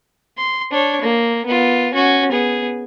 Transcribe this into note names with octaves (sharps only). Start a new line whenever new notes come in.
C6
D4 C#5
A#3
B3 F4
C#4 F#4
B3 G#4